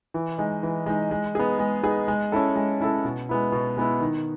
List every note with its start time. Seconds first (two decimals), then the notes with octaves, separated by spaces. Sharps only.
0.14 E3
0.38 G#3 D#4
0.63 E3
0.86 G#3 D#4
1.11 G#3
1.35 B3 D#4 G#4
1.59 G#3
1.83 B3 D#4 G#4
2.08 G#3
2.32 C#4 E4 A4
2.56 G#3
2.81 C#4 E4 A4
3.05 B2
3.29 G#3 B3 E4
3.52 B2
3.77 G#3 B3 E4
4.01 D#3